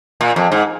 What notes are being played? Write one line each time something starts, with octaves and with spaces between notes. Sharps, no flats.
A#2
F2
G#2